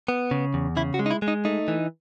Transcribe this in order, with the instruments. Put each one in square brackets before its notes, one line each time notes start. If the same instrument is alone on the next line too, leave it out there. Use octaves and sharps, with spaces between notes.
[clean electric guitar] B3
C#3
E2
C#3 E4
F#4
G#3
D#4
E4
G#3
D#4
A3 D#4
E3